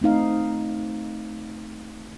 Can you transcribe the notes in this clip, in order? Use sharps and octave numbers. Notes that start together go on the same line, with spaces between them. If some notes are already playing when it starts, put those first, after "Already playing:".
A3 C4 D#4 F5